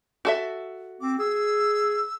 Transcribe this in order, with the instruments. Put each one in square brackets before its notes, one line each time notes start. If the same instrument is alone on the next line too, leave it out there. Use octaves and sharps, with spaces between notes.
[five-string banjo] F#4 A4 E5
[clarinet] C4 [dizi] D6
[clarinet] G#4 [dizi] E6